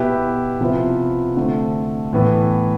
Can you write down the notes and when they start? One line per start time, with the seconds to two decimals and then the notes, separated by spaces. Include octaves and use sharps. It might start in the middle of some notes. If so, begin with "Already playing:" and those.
Already playing: B2 B3 E4 G4 B4
0.60 C3 F3 B3 E4 B4
1.36 D3 A3 C4
2.13 A2 E3 B3